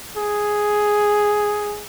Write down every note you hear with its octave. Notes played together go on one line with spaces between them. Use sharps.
G#4